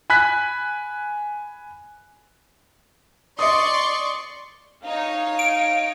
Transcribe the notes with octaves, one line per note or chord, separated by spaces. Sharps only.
G#5 B5 F#6 B6
D5 D#5 C6 C#6 D#6
D#4 C#5 F5
D7